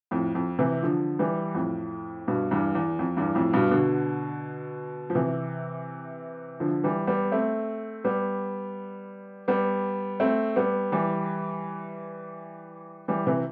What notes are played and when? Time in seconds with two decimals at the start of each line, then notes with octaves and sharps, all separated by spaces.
0.11 F2 A2
0.35 F2
0.59 C3 E3
0.83 D3 F3
1.19 E3 G3
1.55 F2 A2
2.28 G2 B2
2.51 E2 G2
2.75 E2
2.99 F2
3.17 E2 G2
3.35 F2 A2
3.53 G2 B2
3.71 B2 D3
5.10 F3
5.15 C3 E3
6.60 D3 F3
6.84 E3 G3
7.07 G3 B3
7.32 A3 C4
8.04 G3 B3
9.48 G3 B3
10.20 A3 C4
10.56 G3 B3
10.92 E3 G3
13.08 E3 G3
13.27 C3 E3